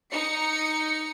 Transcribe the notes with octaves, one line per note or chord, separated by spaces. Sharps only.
D#4 C#7